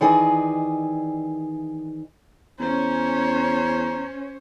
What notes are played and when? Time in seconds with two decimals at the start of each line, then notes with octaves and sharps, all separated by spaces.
0.01 D#3 E3 G#4 D5 D#5
2.60 E2 C#4 C5 C#5 A#5